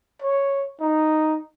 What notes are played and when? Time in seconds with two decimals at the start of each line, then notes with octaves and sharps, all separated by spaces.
0.22 C#5
0.81 D#4